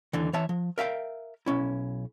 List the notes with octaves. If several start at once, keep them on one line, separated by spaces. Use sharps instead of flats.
D#2 D3 E3
E3 C#5 E5 A5
F3
A#4 E5 F5 G5
B1 C#4 E4